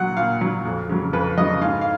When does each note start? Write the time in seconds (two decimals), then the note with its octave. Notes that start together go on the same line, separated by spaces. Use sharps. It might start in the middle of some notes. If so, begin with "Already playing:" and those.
Already playing: A#2 F#3 F#5
0.17 A#2 F5
0.41 F#3
0.65 F2
0.89 C#3 F#3
1.13 F2 B4
1.37 C#3 F#3 D#5
1.61 G#2 F5
1.81 F5